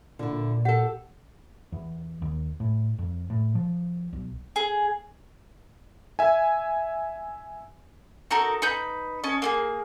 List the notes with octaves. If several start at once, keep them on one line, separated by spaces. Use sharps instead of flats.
A#2 D3 E4
G4 A4 F#5
E2
D#2
A2
F2
A2
F3
B1
G#4
E5 G#5
D#4 F#4 A4 A#4
D#4 B4 G6
C#4 D#5 A5
A#3 F4 G#4